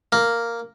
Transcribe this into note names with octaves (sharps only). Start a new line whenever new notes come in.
A#3